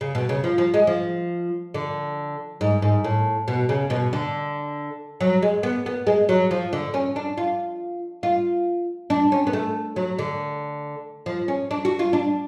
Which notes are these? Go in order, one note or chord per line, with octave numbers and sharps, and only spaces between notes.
C#3
B2
C#3
F3
F3
G#3
F3
D3
G#2
G#2
A2
B2
C#3
B2
D3
F#3
G#3
B3
B3
G#3
F#3
F3
D3
C#4
D4
F4
F4
D4
C#4
B3
A3
F#3
D3
F3
C#4
D4
F#4
F4
D4